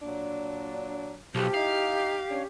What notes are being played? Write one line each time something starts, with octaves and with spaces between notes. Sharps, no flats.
A#2 F#3 D4
B1 F3 G4
D#4 E4 F5
C#4 D4